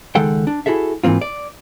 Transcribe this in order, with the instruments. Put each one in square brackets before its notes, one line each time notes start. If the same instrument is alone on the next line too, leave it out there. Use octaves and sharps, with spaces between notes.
[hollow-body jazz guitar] C#2 D#3 G#3 A4 F#5 G5
D4
E4 F#4 G#4 A4 E5
G#2 E3 A#3 C4 F4
D5